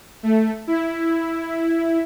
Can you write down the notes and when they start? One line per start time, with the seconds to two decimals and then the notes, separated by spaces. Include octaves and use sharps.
0.23 A3
0.67 E4